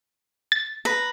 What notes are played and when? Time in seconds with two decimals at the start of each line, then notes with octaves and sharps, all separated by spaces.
0.52 A6
0.85 B4 A#5